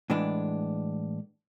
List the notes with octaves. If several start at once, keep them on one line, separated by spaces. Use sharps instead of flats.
A2 E3 G#3 B3 D4